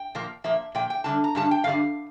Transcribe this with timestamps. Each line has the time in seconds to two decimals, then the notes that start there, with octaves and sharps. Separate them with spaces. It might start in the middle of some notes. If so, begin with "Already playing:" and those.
Already playing: G5
0.15 A#2 F3 A#3
0.44 A#2 F3 A#3 E5
0.75 A#2 F3 G5
0.90 G5
1.04 G2 D3 G3 A5
1.24 A#5
1.35 G2 D3 G3 A5
1.51 G5
1.64 G2 D3 G3 F5